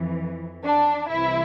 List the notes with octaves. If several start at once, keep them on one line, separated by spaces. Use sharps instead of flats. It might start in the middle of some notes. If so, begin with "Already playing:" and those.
Already playing: F2 E3
D4
C2 C3 E3 E4